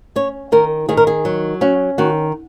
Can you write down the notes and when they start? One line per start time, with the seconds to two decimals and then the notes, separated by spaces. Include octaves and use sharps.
0.16 C#4 C#5
0.52 D#3 A#4
0.89 D#3 G#4
0.97 A#4
1.07 G#4
1.25 F#3
1.61 C#4 F#4
1.98 D#3 F#4